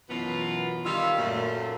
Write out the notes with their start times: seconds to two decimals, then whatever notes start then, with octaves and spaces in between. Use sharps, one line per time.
0.09 F#2 B2 E3 B3 F4 F#4
0.84 D#3 G3 F4 E5 F5
1.18 F#2 A#2 A3